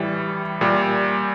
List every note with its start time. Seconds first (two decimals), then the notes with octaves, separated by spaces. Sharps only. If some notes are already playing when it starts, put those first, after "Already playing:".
Already playing: A2 E3 G3
0.61 A#2 G3